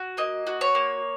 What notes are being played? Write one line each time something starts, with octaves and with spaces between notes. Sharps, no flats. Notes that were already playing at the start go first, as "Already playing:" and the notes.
Already playing: F#4
A#3 D#5
F#4
C#5
A#3